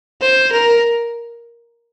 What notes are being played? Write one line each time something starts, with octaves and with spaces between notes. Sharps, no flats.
C5
A#4